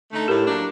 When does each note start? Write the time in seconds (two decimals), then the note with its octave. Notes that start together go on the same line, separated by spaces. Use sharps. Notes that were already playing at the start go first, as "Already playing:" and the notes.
0.11 D3 A3 D#4
0.28 A2 G4 A#4
0.46 F#3 A#3 D4